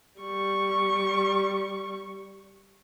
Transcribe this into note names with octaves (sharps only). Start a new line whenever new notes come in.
G3 C#6